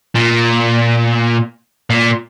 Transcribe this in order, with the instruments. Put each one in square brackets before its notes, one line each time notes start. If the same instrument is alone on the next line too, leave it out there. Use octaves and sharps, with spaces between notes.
[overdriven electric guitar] A#2
A#2